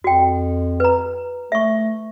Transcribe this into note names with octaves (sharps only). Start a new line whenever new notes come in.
F2 F#4 G5
B4 A#5
A3 E5 C#6